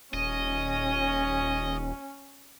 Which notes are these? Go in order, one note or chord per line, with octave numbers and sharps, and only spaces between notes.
D#1 C#4 D#5